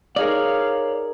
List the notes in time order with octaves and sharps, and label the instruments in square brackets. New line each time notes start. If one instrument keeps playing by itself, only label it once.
[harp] D#4 G#4 A#4 [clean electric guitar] C#5 D5 [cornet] F5